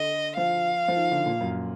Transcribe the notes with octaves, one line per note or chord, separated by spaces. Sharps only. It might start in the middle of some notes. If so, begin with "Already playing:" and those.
Already playing: D3 D#5
F3 F5
F3
D#3
D3
A#2
F#2